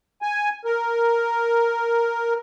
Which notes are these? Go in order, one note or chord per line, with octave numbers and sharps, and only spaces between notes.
G#5
A#4